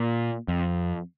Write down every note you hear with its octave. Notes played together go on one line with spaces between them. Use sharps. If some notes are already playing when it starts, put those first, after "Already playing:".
Already playing: A#2
F2